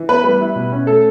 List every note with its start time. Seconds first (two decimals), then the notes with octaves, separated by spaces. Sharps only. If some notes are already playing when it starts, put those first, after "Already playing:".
Already playing: E3
0.09 B3 B4
0.24 G3 B4
0.41 E4
0.55 B2
0.72 C#4
0.87 A3 A4